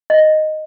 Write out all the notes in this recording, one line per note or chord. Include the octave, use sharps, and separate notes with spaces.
D#5